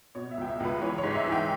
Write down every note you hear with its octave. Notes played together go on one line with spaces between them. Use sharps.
B2 C#5
E5
C#2 G5
E5
C#2 B4
E3 C#5
C#5
G#2
E5
E3
G5